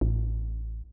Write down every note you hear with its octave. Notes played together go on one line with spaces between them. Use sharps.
A1